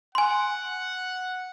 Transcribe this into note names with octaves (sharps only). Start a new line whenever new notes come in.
F#5 G#5 C6